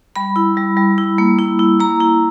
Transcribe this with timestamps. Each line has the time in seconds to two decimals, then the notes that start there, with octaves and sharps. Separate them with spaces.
0.16 G3 B5
0.36 E4
0.57 G3
0.77 G3
0.98 E4
1.18 A#3
1.39 E4
1.59 E4
1.80 A#3 A#5
2.00 E4